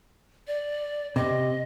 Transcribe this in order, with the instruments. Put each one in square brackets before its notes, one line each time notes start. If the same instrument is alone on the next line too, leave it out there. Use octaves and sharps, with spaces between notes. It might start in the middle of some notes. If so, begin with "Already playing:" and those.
[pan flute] D5
[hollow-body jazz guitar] C3 [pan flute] D#5